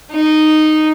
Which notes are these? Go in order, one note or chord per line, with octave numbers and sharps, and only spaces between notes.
D#4